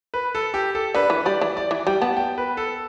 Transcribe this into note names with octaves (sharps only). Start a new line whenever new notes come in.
B4
A4
G4
A4
D3 B4
E3
G3 D5
E3
D5
E3
G3 G5
B3 A5
G5
B4
A4